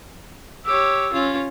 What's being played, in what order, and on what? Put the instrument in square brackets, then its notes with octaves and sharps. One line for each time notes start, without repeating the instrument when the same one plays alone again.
[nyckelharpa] G4 C#5 [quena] E6
[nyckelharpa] C#4 F4